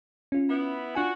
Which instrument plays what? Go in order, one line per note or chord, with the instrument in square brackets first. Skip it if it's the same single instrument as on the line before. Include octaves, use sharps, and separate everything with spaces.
[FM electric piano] C#4 F4
[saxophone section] B3 E4
[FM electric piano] D4 F4 G#5 [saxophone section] F#4